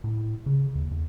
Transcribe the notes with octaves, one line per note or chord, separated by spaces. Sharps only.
A2
C#3
D#2
E2